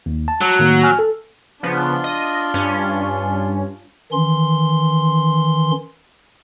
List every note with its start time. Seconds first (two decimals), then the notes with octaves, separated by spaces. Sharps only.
0.06 D#2
0.28 A5
0.41 F#3
0.59 A2 D#3 A#3
0.83 G#5 F6
0.99 A4
1.63 C#3 F3 B3 D4 F4
2.04 D#5
2.54 G2 C#4
4.12 D#3 E3 C#4 C6